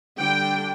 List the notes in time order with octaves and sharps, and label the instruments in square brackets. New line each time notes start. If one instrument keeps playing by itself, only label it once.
[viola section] D3 G3 D4 G5